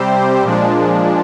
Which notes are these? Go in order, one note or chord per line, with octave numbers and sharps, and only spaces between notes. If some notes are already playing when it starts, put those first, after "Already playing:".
Already playing: C3 G3 C4 G4 C5
A#2 F3 G#3 D4